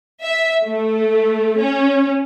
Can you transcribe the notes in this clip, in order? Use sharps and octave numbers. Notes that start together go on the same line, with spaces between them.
E5
A3
C#4